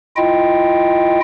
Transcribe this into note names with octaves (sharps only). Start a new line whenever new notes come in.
E4 F4 D#5 G5